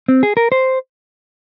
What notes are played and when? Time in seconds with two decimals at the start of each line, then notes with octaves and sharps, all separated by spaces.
0.08 C4
0.23 G#4
0.37 A#4
0.52 C5